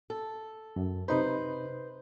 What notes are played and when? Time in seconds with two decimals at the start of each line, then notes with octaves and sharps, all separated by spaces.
0.10 A4
0.76 F#2
1.08 C3 D#4 B4 C5 B5